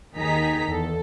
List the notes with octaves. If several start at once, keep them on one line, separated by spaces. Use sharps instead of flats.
D#2 D#3 D#4 G#4 A#5 B6
E2 A4